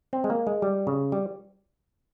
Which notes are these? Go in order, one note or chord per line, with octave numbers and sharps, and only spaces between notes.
C4
G#3
A#3
G#3
G3
C#3
G3